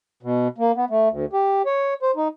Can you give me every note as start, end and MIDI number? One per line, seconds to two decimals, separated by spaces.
0.23 0.48 47
0.58 0.72 58
0.76 0.85 59
0.90 1.09 57
1.10 1.25 38
1.33 1.62 67
1.66 1.94 73
2.02 2.11 72
2.16 2.28 63